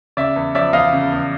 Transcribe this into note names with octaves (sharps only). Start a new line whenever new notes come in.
C#3 D5 E5
E2
F3 D5 E5
E2 D#5 F5
C#3
E2